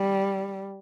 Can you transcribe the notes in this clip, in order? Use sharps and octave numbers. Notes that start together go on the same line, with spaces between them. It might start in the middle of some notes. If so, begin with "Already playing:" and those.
Already playing: G3